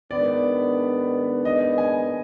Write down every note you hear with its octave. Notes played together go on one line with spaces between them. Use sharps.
G#2 D#3 B3 D4 D5
D#5
G#5